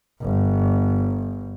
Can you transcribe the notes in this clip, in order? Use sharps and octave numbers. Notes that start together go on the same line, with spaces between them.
G1